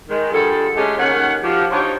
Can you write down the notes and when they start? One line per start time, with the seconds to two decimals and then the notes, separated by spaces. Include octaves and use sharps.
0.09 D#3 G#3
0.32 D3 G3 F4 G#4 A4
0.76 G#3 A3 C#4 D#4 G4 G#4
0.98 D#2 D#3 C#4 F#5
1.43 F3 F#4 G4
1.71 D4 D#4 F4 G4 C5 C#5